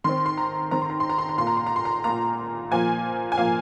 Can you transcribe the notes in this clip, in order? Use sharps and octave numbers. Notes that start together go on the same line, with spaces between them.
D#3 C4 C6
C6
A#5
D#3 C4 A#5
C6
A#5
C6
A#5
C6
A#5
A#2 A#3 C6
A#5
C6
A#5
C6
A#5
A#3 A#5
A#2
A#2 F3 A#3 G#5
G#5
A#2 F3 A#3 F5